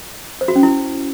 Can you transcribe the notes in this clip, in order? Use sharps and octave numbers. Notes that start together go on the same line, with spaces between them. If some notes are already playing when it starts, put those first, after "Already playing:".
C5
F#4
C#4
E4